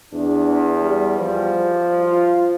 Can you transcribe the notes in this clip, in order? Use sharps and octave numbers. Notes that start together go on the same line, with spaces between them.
E2 D4
G3
F3
F4